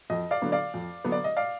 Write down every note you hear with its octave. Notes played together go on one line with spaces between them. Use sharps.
F2 D#5
D5 F5
D3 F#3 B3 D4
D5 F5
F2
D3 F#3 B3 D4
D5
D#5
D5 F5